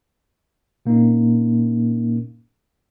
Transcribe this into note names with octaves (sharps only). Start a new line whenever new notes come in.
A#2 A#3 C4 C#4 D#4